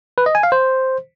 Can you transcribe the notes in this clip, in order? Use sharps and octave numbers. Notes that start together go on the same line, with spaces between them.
B4
D#5
G#5
F5
C5